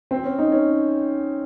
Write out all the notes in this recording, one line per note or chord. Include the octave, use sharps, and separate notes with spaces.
C4
C#4
D#4
C#4